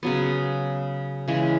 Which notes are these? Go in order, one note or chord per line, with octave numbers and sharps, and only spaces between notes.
C#3 F#3 B3
C#3 E3 G#3